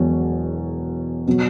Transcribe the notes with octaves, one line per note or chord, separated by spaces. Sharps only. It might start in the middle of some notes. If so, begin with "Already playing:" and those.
Already playing: E1 E2 B2 F#3
B2 F#3